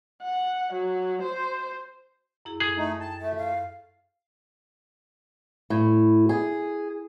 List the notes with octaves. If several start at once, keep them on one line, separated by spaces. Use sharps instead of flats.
F#5
F#3
C5
F#2 E4 G#4
G#4 A4
A3 D#4
G5 A5
A3 E5
F5
A2
G#4